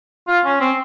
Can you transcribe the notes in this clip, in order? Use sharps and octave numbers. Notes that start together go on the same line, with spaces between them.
F4
C#4
C4